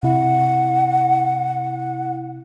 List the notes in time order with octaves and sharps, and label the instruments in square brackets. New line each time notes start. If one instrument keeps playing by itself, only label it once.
[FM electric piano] C3 E4 [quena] F#5